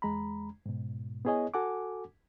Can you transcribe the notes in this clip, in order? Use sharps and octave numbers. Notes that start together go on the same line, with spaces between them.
E2 G#3 A#5 B5
G#2 B2
B3 E4 G#4 C#5 D#5 G#5
F#4 A4 F#5 G#5 D6